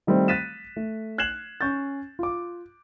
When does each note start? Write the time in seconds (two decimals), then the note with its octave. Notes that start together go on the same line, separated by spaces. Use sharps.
0.07 D#3 G3 A3 C4
0.28 F#6 A6 B6 D#7 E7
0.77 A3
1.18 F#6 G#6 C7 E7 F#7
1.61 C#4 C#6 G6 A6
2.19 F4 D6